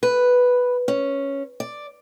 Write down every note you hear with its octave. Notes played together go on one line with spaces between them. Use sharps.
B4
C#4
D5